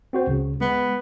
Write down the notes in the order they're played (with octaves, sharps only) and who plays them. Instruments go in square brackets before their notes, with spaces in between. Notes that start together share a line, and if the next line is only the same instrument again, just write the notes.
[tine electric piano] C4 F#4 C5
C#2 C#3
[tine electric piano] G#3 [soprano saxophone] B3